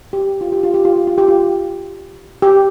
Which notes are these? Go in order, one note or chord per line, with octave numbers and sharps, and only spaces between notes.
G4
F4
G4
F4
G4
F4
G4
F4
G4
F4
G4